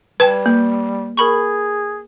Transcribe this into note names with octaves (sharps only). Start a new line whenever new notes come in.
G3 B4 G5 A5 G#6
A#3
G#4 A#4 B5 C#6